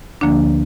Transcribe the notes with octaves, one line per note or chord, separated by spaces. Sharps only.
D2 D3 F3 A#3 D4